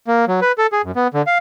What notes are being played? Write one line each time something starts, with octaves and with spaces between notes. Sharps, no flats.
A#3
F#3
B4
A4
G#4
F#2
B3
D3
F5